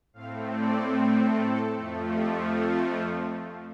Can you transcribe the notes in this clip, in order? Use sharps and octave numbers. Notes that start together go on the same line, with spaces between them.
A2 A3 C4 F5
D5
A4
F2 F3 A3
G4
F4